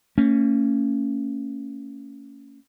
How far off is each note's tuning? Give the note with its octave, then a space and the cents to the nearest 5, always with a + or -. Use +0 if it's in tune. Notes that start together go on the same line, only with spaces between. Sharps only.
A#3 -45 C#4 +0